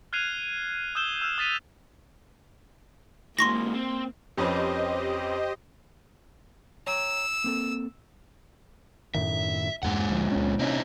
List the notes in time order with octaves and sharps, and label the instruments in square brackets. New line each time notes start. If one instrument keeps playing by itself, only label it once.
[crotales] F6 F#6 G#6 C7 D#7 F7
D#6 E6 G6 E7 G7
E6 F6 G6
D#6 A6 B6 D#7 F7
[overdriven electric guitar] G#2 E3 [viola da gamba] A#3 [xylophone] C6 C#6 A#6
[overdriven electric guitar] C4
[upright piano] F2 C#4 B4 [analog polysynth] G4 C5 D#5
[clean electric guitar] C#5 G5 A#5 [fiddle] E6
[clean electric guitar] A#3 C4 A4
[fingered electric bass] F#2 A2 D#3 [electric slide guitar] E5
[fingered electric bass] E2 G2 [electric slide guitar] A#2 G#3 F#5
[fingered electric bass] D2 F3
C#2 B3 C#4
[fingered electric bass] C3 A#3 C#4 [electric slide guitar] C4 D#4 E4